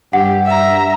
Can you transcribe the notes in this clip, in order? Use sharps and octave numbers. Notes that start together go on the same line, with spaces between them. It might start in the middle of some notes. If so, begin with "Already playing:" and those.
G2 G4 F#5
E5 A#5